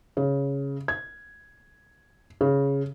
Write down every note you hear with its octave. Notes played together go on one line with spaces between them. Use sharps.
C#3
G#6
C#3